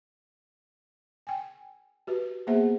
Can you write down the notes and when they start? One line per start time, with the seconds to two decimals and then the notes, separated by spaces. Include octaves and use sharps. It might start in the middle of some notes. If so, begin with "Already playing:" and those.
1.27 G5 G#5
2.07 F#4 G4 B4
2.47 A#3 B3 G#4 C5 E5 F#5